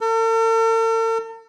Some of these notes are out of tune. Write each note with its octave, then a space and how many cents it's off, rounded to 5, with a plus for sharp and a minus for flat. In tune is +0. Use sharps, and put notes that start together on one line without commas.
A4 +45